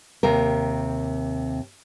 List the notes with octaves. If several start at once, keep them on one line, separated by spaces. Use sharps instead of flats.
D#2 C3 A#4